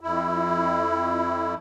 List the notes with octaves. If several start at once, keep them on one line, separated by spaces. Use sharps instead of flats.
F2 E4